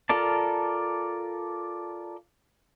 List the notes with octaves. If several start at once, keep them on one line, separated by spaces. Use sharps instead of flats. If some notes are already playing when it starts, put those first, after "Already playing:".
F4 A4 A#4 D5 A5